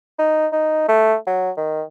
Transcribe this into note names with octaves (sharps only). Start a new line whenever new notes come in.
D#4
D#4
A3
F#3
D#3